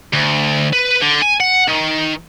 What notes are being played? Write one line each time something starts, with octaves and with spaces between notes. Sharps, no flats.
D2
B4
D3
G#5
F#5
D#3